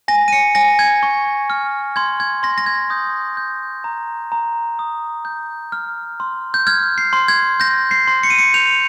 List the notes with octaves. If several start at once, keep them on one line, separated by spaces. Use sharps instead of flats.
G#5 A#6
D#7
C#7
G#5 A#6
G#6
C#6
F6
C6 G#6
G#6
C6 A#6
A#6
G#6
D#6 G6
G6
A#5
A#5
D#6
G6
F6
C6
G6
F6 G#6
C7
C6
G#6
G6 A#6
C7
C6
C#7
D#7
C#7
G6 F7